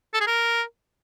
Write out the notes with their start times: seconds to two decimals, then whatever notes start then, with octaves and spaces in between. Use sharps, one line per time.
0.14 A4
0.20 G#4
0.27 A#4